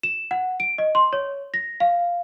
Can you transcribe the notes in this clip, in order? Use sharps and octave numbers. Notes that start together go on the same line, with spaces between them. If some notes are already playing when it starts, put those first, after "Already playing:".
E7
F#5
D7
D#5
C6
C#5
A#6
F5